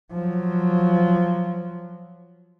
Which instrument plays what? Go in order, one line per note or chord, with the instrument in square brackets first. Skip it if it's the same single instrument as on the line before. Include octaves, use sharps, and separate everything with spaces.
[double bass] F3 F#3